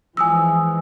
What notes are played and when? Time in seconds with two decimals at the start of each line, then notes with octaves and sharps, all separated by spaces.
0.17 E3 F3 G#3 G#5 D#6 E6